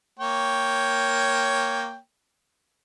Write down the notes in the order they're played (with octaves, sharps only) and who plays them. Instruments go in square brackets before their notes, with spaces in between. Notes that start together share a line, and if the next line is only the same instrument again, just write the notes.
[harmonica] A#3 C#5 G5